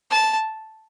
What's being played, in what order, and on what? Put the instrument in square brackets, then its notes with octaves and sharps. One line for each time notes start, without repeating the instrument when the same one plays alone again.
[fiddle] A5